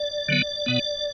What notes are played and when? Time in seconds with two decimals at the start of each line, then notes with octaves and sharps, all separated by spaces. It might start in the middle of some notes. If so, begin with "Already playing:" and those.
Already playing: D5
0.29 D3 F#3 B3
0.66 B2 B3